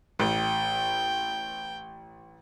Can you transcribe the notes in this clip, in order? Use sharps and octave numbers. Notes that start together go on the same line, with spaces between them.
A1 G5